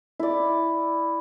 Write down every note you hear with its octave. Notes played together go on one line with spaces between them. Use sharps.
E4 D5